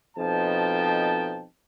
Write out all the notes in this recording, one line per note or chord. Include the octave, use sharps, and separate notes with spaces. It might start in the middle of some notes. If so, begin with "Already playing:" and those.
F2 B2 F3 D#4 G5 A5